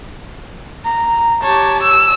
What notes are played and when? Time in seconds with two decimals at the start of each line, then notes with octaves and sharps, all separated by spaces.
0.85 A#5
1.43 G4 C#5 A5
1.82 E6